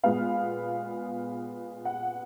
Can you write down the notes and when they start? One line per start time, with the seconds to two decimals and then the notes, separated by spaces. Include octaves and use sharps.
0.03 A#2 G#3 B3 F5
1.85 F#5